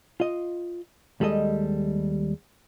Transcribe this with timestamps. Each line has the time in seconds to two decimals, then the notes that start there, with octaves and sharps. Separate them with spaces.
0.20 F4 D#5
1.20 D#2 G3 G#3 A4 D#5